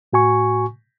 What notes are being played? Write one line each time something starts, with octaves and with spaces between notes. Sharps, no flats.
A2 F#4 G#5 C#6